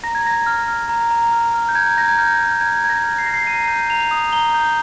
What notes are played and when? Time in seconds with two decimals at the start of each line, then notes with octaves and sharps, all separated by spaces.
0.04 A#5 A#6
0.15 G#6
0.25 A#5 A#6
0.46 F6
0.68 F6
0.89 A#5
1.11 A#5
1.33 F6
1.54 F6
1.69 G6
1.75 A#5 G#6
1.97 A#5 A#6
2.08 G#6
2.18 F6 G6
2.39 F6
2.61 A#5 G#6
2.83 A#5 G#6
2.90 A#6
3.04 F6
3.18 C7
3.25 F6 A#6
3.34 C7
3.47 A#5 D#7
3.68 G6
3.90 A#5 F7
4.11 D#6
4.33 A#5 G7
4.54 G6